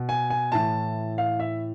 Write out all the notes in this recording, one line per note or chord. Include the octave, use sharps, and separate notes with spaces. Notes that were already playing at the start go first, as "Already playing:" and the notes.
Already playing: B2
G#5
G#5
A2 E3 A5
F5
E5